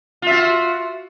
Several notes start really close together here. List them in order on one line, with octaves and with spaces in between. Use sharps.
F4 E5 F#4